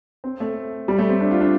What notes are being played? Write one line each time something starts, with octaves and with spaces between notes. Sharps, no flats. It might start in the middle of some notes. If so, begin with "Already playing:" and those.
C4
A3
G3
A3
C4
D4
F4
D4